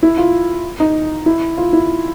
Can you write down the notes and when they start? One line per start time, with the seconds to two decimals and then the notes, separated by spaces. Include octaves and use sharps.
0.03 E4
0.18 F4
0.80 D#4
1.26 E4
1.57 F4
1.73 E4